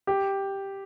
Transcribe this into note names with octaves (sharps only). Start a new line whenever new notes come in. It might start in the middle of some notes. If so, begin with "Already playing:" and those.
G4